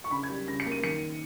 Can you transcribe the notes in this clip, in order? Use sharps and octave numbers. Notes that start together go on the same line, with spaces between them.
C#6
C#3 B5
G#6
G3
C#3 A#6
C#7
A#3
D#7
D#3 C#7